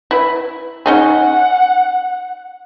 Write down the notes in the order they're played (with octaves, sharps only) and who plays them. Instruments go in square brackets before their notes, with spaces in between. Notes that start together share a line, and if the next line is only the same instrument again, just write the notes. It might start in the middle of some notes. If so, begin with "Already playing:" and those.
[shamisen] E4 B4
[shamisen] C#4 D#4 G#4 [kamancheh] F#5